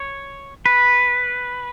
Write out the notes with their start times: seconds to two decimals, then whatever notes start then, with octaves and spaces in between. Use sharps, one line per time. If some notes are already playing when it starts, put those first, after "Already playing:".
Already playing: C#5
0.66 B4